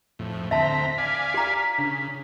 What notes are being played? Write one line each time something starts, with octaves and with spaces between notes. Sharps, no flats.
F2 A2
D2 C4 E5 A5 A#5 C6 B6
D5 F5 G#5
G4 A#5
C#3 D4